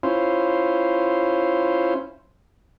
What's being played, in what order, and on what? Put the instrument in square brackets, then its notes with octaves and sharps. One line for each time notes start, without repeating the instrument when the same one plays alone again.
[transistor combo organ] C#4 E4 F4 C5